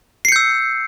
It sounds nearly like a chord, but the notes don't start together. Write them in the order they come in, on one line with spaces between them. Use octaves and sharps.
C7 C#7 G6 E6